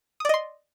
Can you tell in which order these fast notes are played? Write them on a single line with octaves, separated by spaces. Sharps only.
D#6 D5 D#5 C6